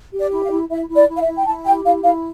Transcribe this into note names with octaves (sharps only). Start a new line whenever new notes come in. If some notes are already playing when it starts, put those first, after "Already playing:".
G4
D5
E4
F5
E4
E4 E5
E4
D5
E4
F5
E5
E4
G5
E4 A5
G4 G5
E4 F5
E4 F5